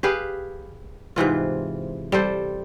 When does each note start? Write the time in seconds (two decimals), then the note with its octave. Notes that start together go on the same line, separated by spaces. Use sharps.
0.03 G4 G#4 B4 F5
1.16 G#2 C3 E3 F4
2.12 G3 A4 C5